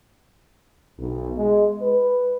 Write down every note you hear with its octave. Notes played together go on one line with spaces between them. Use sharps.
B1
G#3
B4